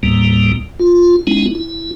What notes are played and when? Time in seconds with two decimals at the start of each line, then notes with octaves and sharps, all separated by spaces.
0.03 D#2 A2 G3 A#3
0.79 F4
1.27 G#3 B3 C#4 D#4 E4
1.55 E4